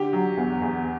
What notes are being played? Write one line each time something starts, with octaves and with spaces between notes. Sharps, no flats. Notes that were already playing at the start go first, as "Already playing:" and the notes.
Already playing: D3 G4
F#3
E2
E2